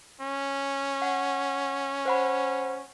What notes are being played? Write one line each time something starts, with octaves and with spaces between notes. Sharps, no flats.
C#4
F#5
C5 F#5 B5